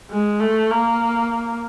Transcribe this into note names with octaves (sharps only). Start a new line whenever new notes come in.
G#3
A3
A#3